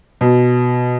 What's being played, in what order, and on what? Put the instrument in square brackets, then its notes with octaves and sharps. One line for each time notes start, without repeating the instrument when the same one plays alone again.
[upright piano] B2